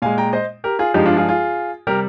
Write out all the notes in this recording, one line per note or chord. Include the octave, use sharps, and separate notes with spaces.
A#2 G#3 F5 G#5
G5 A#5
C5 D#5
G4 A#4
F4 G#4
G2 F3 G#3 D#4 G4
D4 F4
F4 G#4
F4 G#4
C3 G3 G4 A#4